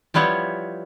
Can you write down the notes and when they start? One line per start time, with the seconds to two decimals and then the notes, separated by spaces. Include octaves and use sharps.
0.14 F3 G3 B3 E4 C#5